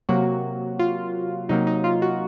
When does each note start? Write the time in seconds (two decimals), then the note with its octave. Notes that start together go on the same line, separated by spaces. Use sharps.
0.09 C3 F#3 A#3 F#4
0.79 F4
1.49 C3 F#3 A#3 D#4
1.67 D#4
1.84 F4
2.02 F#4